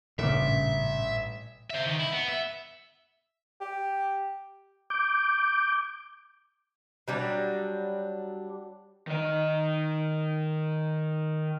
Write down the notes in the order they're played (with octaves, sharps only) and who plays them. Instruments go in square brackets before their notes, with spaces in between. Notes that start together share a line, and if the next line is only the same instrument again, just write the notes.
[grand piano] A1 G2 D6 [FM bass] A#2 [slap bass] C#3 [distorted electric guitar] E5
[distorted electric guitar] C5 E5
D#3
E4
B3
E5
[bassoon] G4
[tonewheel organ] D6 G6
[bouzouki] F#3 G3 D4
[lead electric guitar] D#3 D#5